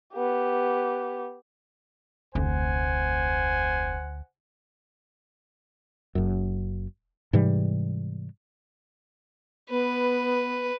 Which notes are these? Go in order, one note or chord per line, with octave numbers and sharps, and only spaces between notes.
B3 G4
F1 D2 C5 F#5 G#5
F#1 F#2
G#2 C3 E3 G3
B3 B4